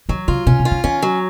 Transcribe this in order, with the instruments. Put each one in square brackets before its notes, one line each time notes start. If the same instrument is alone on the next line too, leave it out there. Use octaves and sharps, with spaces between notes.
[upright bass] D#3 [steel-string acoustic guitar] F#3
[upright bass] C#3 [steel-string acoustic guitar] F4
[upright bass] B2 [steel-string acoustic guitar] C#4
[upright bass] B2
[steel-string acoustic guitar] F4
[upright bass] D#3
[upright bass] D#3 [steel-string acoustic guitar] C#4
[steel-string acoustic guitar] F#3